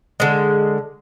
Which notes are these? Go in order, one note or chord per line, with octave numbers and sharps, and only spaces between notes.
D3 G#3